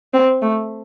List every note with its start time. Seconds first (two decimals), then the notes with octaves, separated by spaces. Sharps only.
0.14 C4
0.42 A3